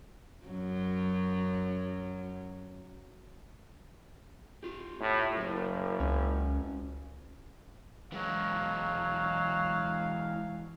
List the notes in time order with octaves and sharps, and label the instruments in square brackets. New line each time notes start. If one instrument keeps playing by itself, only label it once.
[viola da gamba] F#2 F#3
[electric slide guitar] F4 G4
[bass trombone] A2
[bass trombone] F#1 [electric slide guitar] F#3 A#4
[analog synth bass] C#2 [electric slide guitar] C#4
[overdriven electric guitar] E3 G#3 [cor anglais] F#3 [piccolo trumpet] F5